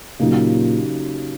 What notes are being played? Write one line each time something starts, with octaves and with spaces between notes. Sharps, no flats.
A#2 C#3 F#3 A#3 D#4 G4